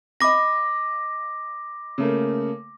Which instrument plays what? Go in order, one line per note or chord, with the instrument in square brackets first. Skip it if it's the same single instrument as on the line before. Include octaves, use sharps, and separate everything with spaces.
[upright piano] D#5 B5 [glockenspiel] D6 A#6
[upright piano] C#3 A3 A#3